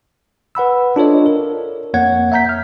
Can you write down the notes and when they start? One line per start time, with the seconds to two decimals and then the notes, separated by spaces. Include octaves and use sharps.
0.55 B4 F#5 B5 E6
0.96 D4 F4 A4 C#5 D#5
1.26 A#4
1.94 F2 A#3 C#5 F#5 G#6
2.32 E5 F#5 A#5 G6 B6
2.49 F6